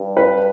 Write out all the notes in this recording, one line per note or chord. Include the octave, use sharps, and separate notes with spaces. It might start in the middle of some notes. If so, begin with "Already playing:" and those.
Already playing: G2
B4